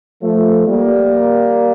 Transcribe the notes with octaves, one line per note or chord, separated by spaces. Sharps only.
F3 A3
G3 A#3